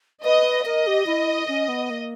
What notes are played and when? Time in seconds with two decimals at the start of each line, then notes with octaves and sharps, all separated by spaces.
0.24 B4 D#5
0.65 A#4 D#5
0.87 G4
1.07 E4
1.48 C#4
1.69 B3
1.90 A#3